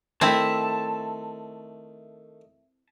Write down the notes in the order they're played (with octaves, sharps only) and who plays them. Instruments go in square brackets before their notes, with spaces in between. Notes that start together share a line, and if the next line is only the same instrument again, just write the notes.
[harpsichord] D#3 A3 [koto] C4 E4 E5 [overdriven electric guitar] A5